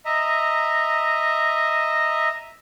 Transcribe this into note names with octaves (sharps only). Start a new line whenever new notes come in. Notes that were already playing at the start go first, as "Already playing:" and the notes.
D#5 E5 A#5